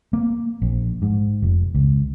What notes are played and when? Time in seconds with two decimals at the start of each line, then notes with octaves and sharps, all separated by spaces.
0.13 A#3
0.62 A#1
1.02 G#2
1.42 F1
1.74 C#2